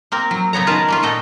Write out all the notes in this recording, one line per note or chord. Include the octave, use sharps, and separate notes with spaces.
A#3 C4 A#4
F#3
C#3 B3 C#5 A#5
D#3 F4 A#4 B4 A5
A#3 C#4 F4
A#2 A4 D#5 G5